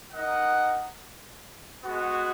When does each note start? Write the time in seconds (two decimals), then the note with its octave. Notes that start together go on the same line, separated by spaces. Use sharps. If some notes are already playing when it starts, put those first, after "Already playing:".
0.11 D#4 A#4 D#5 F#5
1.83 G#3 B3 F#4